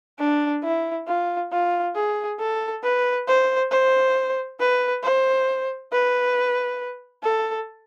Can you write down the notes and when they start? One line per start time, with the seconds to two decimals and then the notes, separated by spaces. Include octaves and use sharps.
0.19 D4
0.63 E4
1.07 F4
1.52 F4
1.95 G#4
2.39 A4
2.83 B4
3.28 C5
3.71 C5
4.59 B4
5.03 C5
5.92 B4
7.23 A4